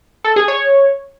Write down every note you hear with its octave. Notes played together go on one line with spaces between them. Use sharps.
A4
G#4
C#5